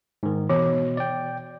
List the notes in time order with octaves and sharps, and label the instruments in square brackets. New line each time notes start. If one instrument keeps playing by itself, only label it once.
[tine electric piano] G#2 D#3
[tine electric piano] B2 [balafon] E3
[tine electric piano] D5 G5